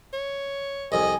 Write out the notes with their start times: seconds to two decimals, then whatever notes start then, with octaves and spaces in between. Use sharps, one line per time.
0.13 C#5
0.92 C2 F2 D#5 G#5